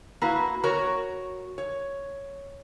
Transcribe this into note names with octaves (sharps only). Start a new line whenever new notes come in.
A#3 E4 F#4 B4
F#4 A#4 C#5
C#5